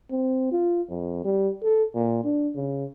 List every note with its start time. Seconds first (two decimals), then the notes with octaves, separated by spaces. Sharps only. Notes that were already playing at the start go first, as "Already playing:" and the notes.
0.11 C4
0.52 F4
0.90 F2
1.25 G3
1.63 A4
1.95 A#2
2.24 D4
2.55 C#3